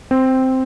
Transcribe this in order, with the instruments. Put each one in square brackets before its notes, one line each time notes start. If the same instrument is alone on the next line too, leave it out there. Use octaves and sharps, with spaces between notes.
[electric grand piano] C4